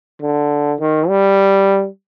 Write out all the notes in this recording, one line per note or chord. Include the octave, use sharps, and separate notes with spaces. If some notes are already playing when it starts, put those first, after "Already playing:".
D3
D#3
G3